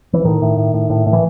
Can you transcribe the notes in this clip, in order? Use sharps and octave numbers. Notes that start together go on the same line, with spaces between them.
E3
A2 D#3
A2
A2
A2
A2
A2
E3